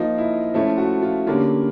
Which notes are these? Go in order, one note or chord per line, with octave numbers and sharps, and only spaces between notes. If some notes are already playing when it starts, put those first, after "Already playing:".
Already playing: F3 A#3 D#4 F4
E4
F3 A3 C#4 E4
F#4
F4
D3 G3 A#3 C#4 F4